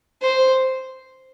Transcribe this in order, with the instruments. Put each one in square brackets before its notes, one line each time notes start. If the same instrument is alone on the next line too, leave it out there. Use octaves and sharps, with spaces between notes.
[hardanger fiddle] C5